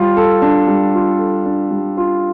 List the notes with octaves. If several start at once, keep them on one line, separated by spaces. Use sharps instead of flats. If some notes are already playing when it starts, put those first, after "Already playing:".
Already playing: G3 F4
A4
D4
G3
F4
A4
D4
G3
F4